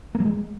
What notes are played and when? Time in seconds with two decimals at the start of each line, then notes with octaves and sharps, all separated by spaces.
0.15 A#3
0.20 F#3
0.25 G#3